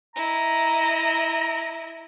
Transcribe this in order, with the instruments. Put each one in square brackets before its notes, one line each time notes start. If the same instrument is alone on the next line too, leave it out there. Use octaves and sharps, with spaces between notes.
[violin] E4 D#5 [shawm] A#5